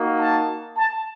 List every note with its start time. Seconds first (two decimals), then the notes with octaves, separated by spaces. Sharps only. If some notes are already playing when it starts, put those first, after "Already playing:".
Already playing: A#3 D#4 F#4
0.20 A5
0.78 A5